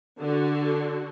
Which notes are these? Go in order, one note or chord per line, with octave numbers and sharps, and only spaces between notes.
D3 F#4